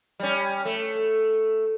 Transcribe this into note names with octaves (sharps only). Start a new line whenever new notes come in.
G3 C#4
A3